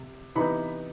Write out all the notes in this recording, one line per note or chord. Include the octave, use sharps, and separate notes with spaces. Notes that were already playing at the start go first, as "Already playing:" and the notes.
Already playing: C3
C3 E3 B3 D#4 B5